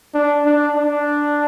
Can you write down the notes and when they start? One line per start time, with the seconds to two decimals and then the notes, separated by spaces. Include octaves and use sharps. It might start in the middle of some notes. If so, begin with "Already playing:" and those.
0.14 D4
0.45 D4
0.75 D4